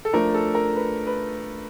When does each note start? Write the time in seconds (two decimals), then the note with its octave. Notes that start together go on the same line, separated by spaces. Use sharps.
0.05 A4
0.13 F3 A3 D4 A#4
0.34 A4
0.55 A#4
0.76 B4
1.07 B4